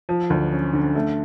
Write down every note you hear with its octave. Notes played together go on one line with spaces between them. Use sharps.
F3
D2
C#4
D3
A3